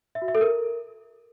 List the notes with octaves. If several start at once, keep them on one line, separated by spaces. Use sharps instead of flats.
E5
F#4
E5
A4
A#4